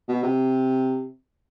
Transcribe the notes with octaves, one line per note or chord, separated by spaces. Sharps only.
B2
C3